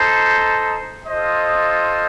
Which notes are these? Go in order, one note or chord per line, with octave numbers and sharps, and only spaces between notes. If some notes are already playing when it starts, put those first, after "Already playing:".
Already playing: D#4 A4 C5
F4 A4 C5 D#5